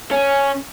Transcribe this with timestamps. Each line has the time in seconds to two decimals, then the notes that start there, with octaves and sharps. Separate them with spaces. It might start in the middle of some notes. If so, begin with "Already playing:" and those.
0.11 C#4